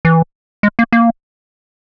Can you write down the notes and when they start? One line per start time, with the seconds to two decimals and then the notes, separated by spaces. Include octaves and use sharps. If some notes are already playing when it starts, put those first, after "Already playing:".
0.05 E3
0.63 G#3
0.79 A#3
0.92 A#3